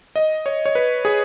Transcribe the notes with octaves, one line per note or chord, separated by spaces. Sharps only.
D#5
C#5
C#5
B4
G#4